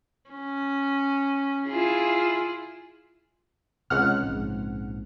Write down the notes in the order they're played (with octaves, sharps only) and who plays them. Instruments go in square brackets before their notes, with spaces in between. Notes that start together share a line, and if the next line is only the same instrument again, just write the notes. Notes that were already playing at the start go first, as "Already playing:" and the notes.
[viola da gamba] C#4
E4 F4 G#4
[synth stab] C#2 F#5 F6 [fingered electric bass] C3
[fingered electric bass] A#1 G#2 C4